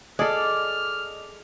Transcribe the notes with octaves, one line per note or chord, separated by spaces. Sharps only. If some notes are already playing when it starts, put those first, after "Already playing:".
G#4 A4 D5 D#5 F6